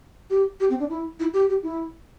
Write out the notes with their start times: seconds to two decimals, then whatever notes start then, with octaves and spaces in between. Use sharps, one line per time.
0.30 G4
0.60 G4
0.70 C4
0.80 D4
0.90 E4
1.20 E4
1.33 G4
1.49 G4
1.63 E4